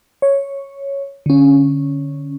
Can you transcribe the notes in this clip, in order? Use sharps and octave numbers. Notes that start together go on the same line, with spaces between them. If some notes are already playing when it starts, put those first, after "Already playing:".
C#5
D3 C#4